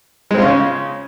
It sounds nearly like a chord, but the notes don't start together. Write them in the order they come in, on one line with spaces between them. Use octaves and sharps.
G#3 C4 F4 C#4 C#3